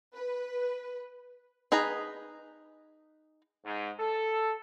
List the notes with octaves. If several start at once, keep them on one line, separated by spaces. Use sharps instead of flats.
B4
D#4 G#4 B4 A#5
G#2
A4